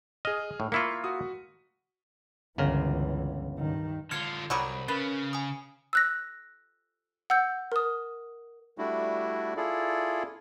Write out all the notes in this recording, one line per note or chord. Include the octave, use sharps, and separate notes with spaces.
G#4 D#5 F6
A2
A#3 E4 F4 C#6 B6 C#7
F#4 D#6
G1 C#2 C#3 E3 A#4
G2 D#3
D3 F4 F6 G#6 C#7
C2 D3 F#3 G3 B5 D#6
C#3 C#4 A#4 B4 A6
G#5 D#6
E6 F#6 A#6
F#5 E6 G6
A#4 D#6
G3 A3 D4 E4 F#4
E4 F4 G#4 A4 D5